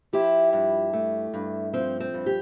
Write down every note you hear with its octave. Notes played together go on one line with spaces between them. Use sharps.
F3 E4 G4
G2
A3
G2
F3 C4
C4
G2
G4